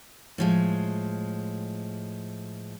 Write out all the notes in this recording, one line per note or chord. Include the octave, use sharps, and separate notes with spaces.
A2 F3 G#3